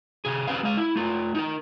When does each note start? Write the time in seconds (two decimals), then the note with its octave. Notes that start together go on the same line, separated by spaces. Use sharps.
0.25 C3 G#4
0.47 C4 C#4 G4 B4 F5
0.63 G#3 F5
0.77 E4
0.95 A3 F4
1.35 D#4 A#4